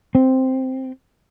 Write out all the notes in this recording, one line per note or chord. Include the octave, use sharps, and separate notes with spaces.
C4